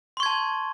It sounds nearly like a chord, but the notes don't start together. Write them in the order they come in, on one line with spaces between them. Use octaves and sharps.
C6 C#6 G#6 A5